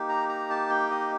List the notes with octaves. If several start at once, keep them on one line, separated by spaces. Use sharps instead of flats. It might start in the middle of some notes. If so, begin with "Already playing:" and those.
Already playing: A#3 D#4 G4
A#5
A#5
A5
G5
D#5